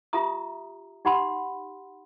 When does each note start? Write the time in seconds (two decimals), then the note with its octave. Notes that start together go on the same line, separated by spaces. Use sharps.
0.13 F4 G4 E5 A#5 D#6
1.05 D#4 G4 F#5 B5 C6